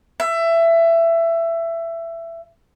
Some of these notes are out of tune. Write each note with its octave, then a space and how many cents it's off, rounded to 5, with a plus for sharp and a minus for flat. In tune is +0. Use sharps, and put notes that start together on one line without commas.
E5 +20